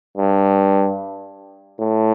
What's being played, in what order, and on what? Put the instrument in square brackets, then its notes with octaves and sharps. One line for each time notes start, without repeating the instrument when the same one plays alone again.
[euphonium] G2
A2